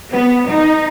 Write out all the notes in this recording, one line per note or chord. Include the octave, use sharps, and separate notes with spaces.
B3
D#4